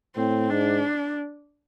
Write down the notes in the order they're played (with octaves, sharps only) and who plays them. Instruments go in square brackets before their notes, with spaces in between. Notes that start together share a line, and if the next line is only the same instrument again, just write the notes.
[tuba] A2 [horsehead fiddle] C4
[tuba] G#2 [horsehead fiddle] D4